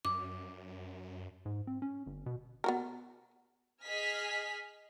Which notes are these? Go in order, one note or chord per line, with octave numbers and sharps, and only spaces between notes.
F#2 D6
G#2
C4
C#4
G1
B2
B3 F#4 A#4
G#4 D#5 G#5 F6 B6